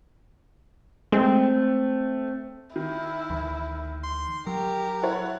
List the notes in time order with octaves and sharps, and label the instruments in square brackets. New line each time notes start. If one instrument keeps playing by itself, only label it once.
[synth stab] G#3 [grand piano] A3 [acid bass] C4
[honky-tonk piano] D#3 [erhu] E4
[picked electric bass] D2 E3
[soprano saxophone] C6
[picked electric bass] F#3 [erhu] G4 [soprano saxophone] A#4
[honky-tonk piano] E4 A4 C#5 [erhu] F#5